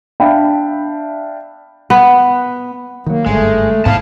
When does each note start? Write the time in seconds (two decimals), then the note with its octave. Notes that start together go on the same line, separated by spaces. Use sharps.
0.20 D4 E5 F5 G5 B5
1.90 B3
3.06 D#3 F#3 A#3
3.26 G1 G#2 G#3 A3
3.85 G#1 G#2 B3 E4 F5 A5